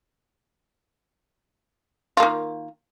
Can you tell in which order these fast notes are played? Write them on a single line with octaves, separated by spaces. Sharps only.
F4 A#3 D#3